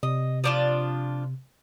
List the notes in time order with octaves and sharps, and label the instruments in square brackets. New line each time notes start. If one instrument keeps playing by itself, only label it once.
[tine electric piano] C3 [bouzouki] D#5
[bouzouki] F3 D4 F4